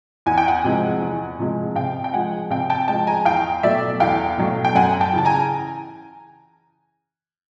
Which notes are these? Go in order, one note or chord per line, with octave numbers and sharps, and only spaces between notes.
E2 G#5
G5
F#5 G#5
C3 F3 G#3
E2
C3 F3 G#3
C3 F5 G5
G5
F3 G#3 F#5 G#5
C3 F5 G5
G5 A5
F3 G#3 G5 A5
G#5 A#5
E2 F5 G5
B2 F#3 A3 D5 E5
E2 F5 G5
B2 F#3 A3
G5
F#2 F#5 G#5
G5 A5
C#3 E3 A5
G#5 A#5